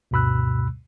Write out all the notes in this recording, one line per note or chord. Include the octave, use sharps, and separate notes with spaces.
D2 G2 B2 B5 E6 F#6